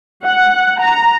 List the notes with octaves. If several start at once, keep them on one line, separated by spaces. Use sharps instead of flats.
F#5
A#5